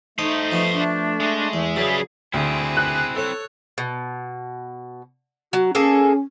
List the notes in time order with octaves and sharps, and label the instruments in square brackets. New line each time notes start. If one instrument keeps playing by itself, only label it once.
[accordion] A3 [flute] D#4 [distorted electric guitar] C5 D#5 [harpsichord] A5
[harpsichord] F3 B3
[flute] D4
[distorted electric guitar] G#3
[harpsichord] E2 [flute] E5
[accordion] C#3 G#4 [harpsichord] F#3 [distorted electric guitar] G3 B4
[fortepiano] D2 [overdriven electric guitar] C4 E4 [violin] G#4
[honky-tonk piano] F#6
[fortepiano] A4 [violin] C#5
[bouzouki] B2
[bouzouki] F#3 [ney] F#4
[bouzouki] A#3 G#4 A4 [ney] C#4